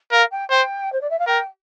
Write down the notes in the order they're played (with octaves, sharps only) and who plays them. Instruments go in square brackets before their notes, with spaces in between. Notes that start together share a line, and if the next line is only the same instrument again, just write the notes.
[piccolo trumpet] A#4 [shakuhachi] F5
[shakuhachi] G5
[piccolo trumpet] C5 [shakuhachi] G5
[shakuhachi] C5
D5
E5
F5
[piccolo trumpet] A#4 [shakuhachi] G5